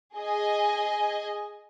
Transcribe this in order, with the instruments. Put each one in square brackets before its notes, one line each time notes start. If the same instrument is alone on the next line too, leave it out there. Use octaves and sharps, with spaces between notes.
[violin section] G#4 D#5 G#5